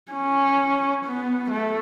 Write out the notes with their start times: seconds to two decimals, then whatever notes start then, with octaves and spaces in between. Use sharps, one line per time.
0.12 C#4
1.04 B3
1.50 A3